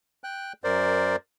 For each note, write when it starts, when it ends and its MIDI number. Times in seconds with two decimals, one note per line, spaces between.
0.24 0.53 79
0.24 0.53 90
0.64 1.16 42
0.64 1.16 70
0.64 1.16 72
0.64 1.16 74